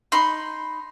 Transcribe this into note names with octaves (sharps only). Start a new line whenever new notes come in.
D#4 B5 C6